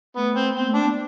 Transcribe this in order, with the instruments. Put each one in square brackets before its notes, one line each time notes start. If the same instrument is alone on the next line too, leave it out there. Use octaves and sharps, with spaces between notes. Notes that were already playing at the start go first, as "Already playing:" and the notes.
[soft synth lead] A3 [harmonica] B3
[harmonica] C4
[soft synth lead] B3 [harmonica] C4
[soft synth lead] A3
[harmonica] D4
[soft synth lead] B3